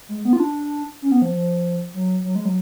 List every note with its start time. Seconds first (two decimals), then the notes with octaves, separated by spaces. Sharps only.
0.09 G#3
0.25 B3
0.33 F4
0.40 D4
1.02 C#4
1.12 B3
1.22 F3
1.32 F3
1.94 F#3
2.24 F#3
2.35 G#3
2.45 F#3